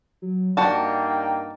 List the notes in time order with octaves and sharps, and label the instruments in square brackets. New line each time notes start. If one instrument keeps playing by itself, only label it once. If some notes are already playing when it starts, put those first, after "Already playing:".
[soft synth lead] F#3
[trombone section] G2 A#3 D#4 [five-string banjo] D4 F#4 A5 [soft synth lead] G5